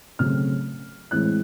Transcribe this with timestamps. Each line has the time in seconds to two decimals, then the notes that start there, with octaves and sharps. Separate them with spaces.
0.19 C#3 F#3 A3 C4 F6
1.11 A2 E3 G#3 C4 F#6